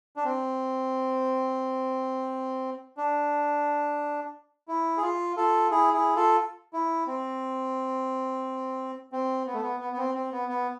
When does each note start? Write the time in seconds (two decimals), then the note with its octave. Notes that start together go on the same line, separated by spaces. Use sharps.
0.16 D4
0.24 C4
2.97 D4
4.68 E4
4.97 G#4
5.02 F4
5.37 F4 A4
5.71 E4 G#4
5.94 E4 G#4
6.16 F4 A4
6.73 E4
7.07 C4
9.12 C4
9.47 B3
9.54 A3
9.62 B3
9.80 B3
9.93 B3
9.97 C4
10.15 C4
10.32 B3
10.49 B3